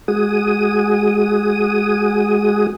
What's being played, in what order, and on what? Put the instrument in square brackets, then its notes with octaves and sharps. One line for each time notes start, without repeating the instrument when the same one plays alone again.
[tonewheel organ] G#3 F#4 G#4 D#6